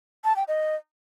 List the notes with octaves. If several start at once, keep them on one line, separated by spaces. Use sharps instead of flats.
A5
G5
D#5